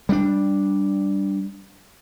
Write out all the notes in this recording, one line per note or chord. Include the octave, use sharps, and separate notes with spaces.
G3 A3 D4